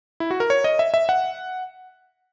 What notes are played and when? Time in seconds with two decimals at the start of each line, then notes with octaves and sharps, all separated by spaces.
0.20 E4
0.31 F#4
0.40 A#4
0.50 C#5
0.64 D#5
0.79 E5
0.94 E5
1.09 F#5